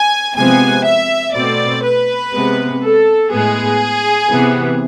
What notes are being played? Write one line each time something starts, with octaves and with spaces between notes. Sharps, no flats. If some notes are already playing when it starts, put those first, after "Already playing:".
Already playing: G#5
C3 F3 G#3 B3 G#5
E5
B2 A3 C4 D5
B4
C3 G#3 B3
A4
A2 G#3 B3 G#4
C3 E3 B3